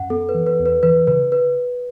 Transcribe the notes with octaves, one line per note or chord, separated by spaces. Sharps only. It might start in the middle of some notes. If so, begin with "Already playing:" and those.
Already playing: F#2 F#5
B3 A4
B4
E3
B4
E2
B4
E3 B4
C#3 B4
B4